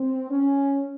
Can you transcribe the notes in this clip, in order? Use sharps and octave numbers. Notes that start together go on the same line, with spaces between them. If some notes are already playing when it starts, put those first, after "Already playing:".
Already playing: C4
C#4